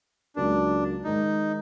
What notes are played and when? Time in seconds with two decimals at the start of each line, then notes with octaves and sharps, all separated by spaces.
0.36 C#2 C#3 F#3 A#3 D4
1.04 G#2 D#3 G#3 D#4